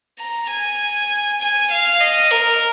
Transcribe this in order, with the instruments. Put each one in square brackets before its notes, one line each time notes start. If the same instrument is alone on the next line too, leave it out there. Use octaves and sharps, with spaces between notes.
[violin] A#5
G#5
G#5
F5
D#5
A#4